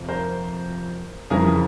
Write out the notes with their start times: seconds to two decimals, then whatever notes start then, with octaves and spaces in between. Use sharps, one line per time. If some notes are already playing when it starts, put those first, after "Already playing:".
Already playing: F2 C3 F3
0.09 A#4 C5
1.30 F2 C#3 E3 G#4 A#4
1.47 G#4